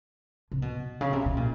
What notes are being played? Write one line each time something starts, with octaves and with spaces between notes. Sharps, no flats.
C3
B2
C#3
C3
B2
A#2